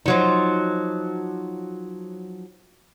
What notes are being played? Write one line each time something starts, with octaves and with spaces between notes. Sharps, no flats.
F3 F#3 D#4